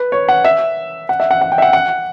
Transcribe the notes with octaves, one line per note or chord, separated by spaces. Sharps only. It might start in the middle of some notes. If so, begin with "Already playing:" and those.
Already playing: B4
C#5
F#5
E5
F#5
E5
F#5
F#5
G5
E5
F#5
F#5